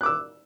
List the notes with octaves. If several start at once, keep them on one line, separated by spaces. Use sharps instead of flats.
D6 E6 F#6